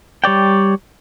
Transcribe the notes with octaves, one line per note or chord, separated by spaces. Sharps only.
G3 C#5 D5 G5